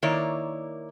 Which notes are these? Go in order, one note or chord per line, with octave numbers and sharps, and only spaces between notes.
D#3 A#3 E4 C#5 D5